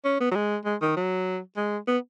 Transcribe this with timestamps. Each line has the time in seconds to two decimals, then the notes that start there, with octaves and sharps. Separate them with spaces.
0.05 C#4
0.21 B3
0.31 F#3
0.36 G#3
0.65 G#3
0.82 D#3
0.97 F#3
1.57 G#3
1.87 B3